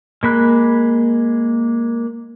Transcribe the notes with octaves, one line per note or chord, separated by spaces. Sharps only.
G#3 A#3 B5 F#6